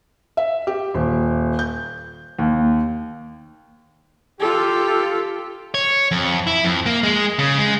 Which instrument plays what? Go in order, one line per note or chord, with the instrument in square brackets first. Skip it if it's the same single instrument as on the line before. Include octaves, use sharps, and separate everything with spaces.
[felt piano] E5
G4
D#1
G6
D#2
[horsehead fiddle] F4 A4 [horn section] G4
[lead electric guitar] C#5
F2
E4
F2
A#3
G#3
C#3
G#3